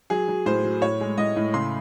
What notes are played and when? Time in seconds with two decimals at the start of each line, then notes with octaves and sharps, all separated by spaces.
0.10 F#3 G#4
0.28 F#3
0.46 A2 C5
0.64 F#3
0.82 A2 C#5
1.01 G#3
1.18 A2 D#5
1.36 A2
1.54 C#3 C6